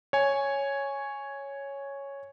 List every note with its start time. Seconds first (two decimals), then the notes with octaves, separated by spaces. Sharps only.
0.13 C#5 G#5